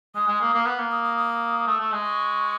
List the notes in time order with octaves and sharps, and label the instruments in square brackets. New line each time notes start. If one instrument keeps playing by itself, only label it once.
[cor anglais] G#3 [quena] D#6
[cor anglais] G#3
A#3
A#3
B3
A#3
[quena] D#6
D#6
D#6
[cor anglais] A3
A3
G#3
[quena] C#6